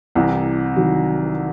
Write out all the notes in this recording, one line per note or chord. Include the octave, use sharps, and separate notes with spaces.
C2 C3 E3
D#3 F#3